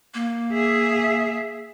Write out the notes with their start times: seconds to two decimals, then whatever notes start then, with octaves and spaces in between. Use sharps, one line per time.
0.14 A#3
0.53 G#4 E5